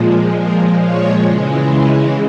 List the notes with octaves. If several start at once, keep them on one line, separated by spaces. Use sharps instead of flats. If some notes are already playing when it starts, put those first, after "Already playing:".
Already playing: A#2 F3 G#3
A#2 F3 G#3 A#4
C#5
C#3 E3 G#3